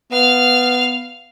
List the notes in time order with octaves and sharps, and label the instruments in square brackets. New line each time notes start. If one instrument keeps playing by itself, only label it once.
[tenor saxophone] B3 [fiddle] F5 F6